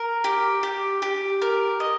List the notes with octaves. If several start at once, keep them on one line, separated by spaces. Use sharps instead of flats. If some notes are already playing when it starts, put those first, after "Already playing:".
Already playing: A#4
G4
G4
G4
A#4
D#5